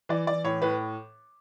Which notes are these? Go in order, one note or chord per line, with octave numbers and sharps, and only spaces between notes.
E3 D5
E3 D5
A2 C#5
A2 B4